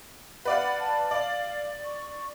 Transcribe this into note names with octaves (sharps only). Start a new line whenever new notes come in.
B4 D5 F5 F#5
A5
D5 F5
C#6